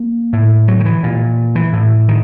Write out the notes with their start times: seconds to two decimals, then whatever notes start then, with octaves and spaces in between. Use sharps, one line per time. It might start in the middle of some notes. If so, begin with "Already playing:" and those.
Already playing: A#3
0.33 A2
0.68 F#3
0.80 D#3
0.85 E3
1.03 A#2
1.55 E3
1.73 A2
2.08 D#3